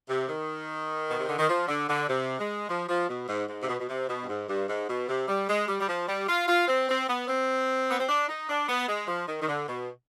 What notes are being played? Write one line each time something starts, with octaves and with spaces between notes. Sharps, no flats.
C3
D#3
B2
C3
D3
D#3
F3
D3
D3
C3
G#3
F3
F3
B2
G#2
G#2
C3
B2
B2
C3
B2
G2
G#2
G2
G#2
B2
C3
G3
G#3
G3
G3
F3
G3
F4
F4
C4
C4
B3
C4
B3
C4
D4
D#4
D4
B3
G#3
F3
D#3
D#3
D3
B2